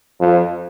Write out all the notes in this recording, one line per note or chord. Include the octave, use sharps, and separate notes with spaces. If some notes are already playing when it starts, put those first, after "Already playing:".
F2